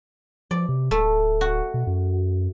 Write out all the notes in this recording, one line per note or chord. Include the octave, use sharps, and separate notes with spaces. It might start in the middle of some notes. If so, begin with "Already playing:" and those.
F3 D5
C3
D1 A3
F#4
B2
F#2